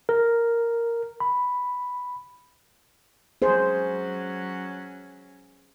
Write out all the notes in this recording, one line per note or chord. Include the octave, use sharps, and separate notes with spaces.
A#4
B5
F#3 C#4 G#4 C5